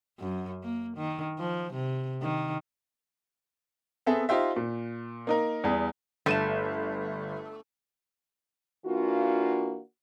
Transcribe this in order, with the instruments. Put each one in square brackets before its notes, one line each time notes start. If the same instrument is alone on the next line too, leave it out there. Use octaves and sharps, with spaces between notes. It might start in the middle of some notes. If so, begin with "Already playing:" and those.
[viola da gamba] F#2
A#3
D#3
F3
C3
D#3
[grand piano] B3 C4 G#4 A4 E5
D#4 F4 G4 C5 E5
A#2
A#3 D#4 A#4
E2 G3 G#4
[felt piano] G1 D#7 E7 [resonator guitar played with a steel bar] A3
[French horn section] E3 A#3 D4 F4 F#4